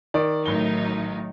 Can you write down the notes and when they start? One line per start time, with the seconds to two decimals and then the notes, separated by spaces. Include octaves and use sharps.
0.14 D#3 D5
0.46 A1 A2 F#3 D#4 G7